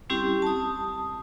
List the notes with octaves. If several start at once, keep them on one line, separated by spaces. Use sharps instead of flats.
G3 C4 C#4 E4 G4
A5 D#6